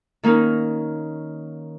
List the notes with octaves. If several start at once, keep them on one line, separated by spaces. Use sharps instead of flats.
D#3 A#3 C#4 D#4 A#4